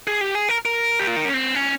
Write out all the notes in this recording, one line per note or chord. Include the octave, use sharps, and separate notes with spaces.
G#4
G4
G#4
A#4
A#4
G4
F4
D#4
C#4
C4
C#4